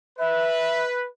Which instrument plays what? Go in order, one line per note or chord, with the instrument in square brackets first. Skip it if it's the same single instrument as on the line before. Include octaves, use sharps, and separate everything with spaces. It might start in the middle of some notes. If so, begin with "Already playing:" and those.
[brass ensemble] B4 [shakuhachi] E5